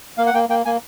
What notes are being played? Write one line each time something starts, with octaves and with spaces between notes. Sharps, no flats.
A#3 F5
F#5
A#3 G5
A#3 G5
A#3 G#5